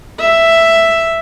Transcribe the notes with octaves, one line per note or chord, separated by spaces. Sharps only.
E5